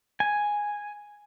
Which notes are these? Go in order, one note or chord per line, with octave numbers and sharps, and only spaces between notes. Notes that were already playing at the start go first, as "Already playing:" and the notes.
G#5